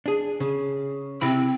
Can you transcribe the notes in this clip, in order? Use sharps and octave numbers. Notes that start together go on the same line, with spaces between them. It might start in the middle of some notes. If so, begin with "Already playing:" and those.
D4 G#4
C#3
C3 C4 E4 B5